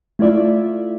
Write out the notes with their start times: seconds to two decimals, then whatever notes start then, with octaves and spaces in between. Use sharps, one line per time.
0.19 A3 E4 F4 D5 E5